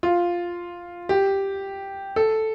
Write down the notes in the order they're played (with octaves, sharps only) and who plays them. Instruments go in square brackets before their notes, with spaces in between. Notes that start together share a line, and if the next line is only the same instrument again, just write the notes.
[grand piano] F4
G4
A4